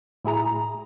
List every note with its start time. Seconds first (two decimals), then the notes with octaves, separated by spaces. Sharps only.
0.24 A2 E4 G#4 A#5